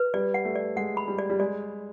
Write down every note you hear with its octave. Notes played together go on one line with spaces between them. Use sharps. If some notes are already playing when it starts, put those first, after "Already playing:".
Already playing: B4
G3 D5
F#5
A3
D5
G#3 F#5
B5
G3
D5
G3
G#3 D5